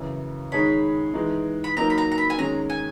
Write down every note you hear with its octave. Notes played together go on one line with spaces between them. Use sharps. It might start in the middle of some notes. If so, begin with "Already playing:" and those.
Already playing: F#2 C#3 E3
D#3 G#3 D#4 G#4 C#5 B5
E3 G#3 D#4
B5
F#3 A#3 D#4 A#4 A#5
B5
A#5
A#5
B5
G#5
D#3 G#3 C#4 A#5
G#5